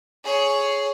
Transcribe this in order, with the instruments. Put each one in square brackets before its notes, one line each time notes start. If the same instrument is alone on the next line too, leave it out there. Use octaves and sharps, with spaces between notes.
[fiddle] G#4 C#5